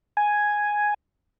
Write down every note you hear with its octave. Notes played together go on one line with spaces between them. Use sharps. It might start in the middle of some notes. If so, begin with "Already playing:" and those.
G#5